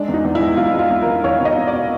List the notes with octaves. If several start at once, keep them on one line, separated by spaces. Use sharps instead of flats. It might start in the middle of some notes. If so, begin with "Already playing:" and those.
Already playing: G#3 D4
E2
D#4
E2
E4
G#3
E2 F4
G#3
F4
E2
A#4
E2
E2 C#5
B2
D#5
E2
D5
B2